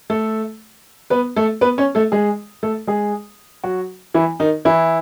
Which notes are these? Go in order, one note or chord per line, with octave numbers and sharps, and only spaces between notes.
A3 A4
B3 B4
A3 A4
B3 B4
C#4 C#5
A3 A4
G#3 G#4
A3 A4
G#3 G#4
F#3 F#4
E3 E4
D#3 D#4
E3 E4